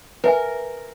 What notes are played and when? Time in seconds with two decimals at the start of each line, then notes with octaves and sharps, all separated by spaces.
0.24 A#4 B4 E5 G#5